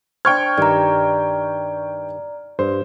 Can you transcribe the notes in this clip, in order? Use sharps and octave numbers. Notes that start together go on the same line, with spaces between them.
D4 C5 G5 C#6 F6 G#6
G2 D#3 G3 D5 A#5
G2 C5